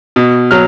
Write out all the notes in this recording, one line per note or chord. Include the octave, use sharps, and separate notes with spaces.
B2
F#3 F6